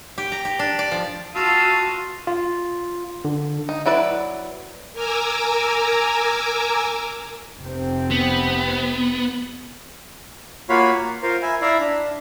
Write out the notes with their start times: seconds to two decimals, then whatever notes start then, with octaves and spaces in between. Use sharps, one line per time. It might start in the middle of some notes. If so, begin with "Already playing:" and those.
0.18 G4
0.32 A#5
0.45 G4
0.59 D4
0.79 D5
0.92 F3
1.35 F4 F#4 F5 A5 D#6 E6
2.27 F4
3.25 D3
3.69 D#4
3.86 F#3 E4 B4 D5
4.93 A#4 G#5 A#5 D6 E6
7.60 F1 C3 C4
8.11 B3
10.69 A#3 F4 F#4 C#5 F5 B5
10.94 A#3
11.23 F4 A#4 C5 F5
11.42 E5 G#5 B5
11.61 E4 D5 E5 F5 A#5 B5
11.79 D4